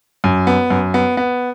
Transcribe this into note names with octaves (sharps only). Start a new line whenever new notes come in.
F#2
B3
F#2
B3
B3